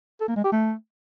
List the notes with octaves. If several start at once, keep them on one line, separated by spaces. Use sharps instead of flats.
A4
A#3
G#3
G4
A3